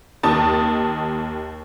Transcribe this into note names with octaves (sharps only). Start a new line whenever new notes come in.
D#2 D#3 A5 D#6